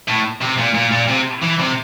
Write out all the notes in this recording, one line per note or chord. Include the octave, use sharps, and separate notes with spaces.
A2
C3
A#2
A#2
A#2
C3
E3
C3